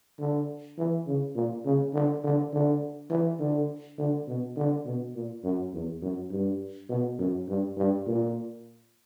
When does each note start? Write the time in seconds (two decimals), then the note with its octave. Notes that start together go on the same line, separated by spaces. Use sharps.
0.19 D3
0.78 E3
1.07 C#3
1.35 A#2
1.65 C#3
1.93 D3
2.24 D3
2.52 D3
3.10 E3
3.39 D3
3.98 D3
4.27 B2
4.57 D3
4.86 B2
5.15 A#2
5.44 F#2
5.73 E2
6.02 F#2
6.31 G2
6.89 B2
7.18 F#2
7.48 G2
7.77 G2
8.06 A#2